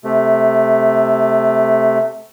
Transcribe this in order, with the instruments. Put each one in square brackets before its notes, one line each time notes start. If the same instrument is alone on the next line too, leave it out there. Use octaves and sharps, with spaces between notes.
[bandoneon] C3 A3